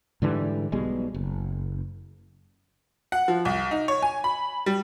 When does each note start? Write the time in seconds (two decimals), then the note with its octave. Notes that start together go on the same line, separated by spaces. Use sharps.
0.22 G#2 D3 E3 G3
0.72 B1 B2 G3 G#3
1.14 F#1
3.12 F#5
3.28 F3
3.45 C2
3.71 D#4
3.88 C#5
4.02 G#5
4.24 B5
4.66 G3